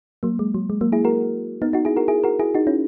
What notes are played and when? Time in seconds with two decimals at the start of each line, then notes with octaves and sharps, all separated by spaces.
0.23 F#3 A#3
0.39 G#3
0.54 F#3
0.70 G#3
0.81 F#3 A#3
0.92 E4 G#4
1.05 F#4 A#4
1.62 B3 D#4
1.73 D#4 F#4
1.85 E4 G#4
1.97 F#4 A#4
2.08 E4 G#4
2.24 F#4 A#4
2.39 E4 G#4
2.54 D#4 F#4
2.67 C#4 E4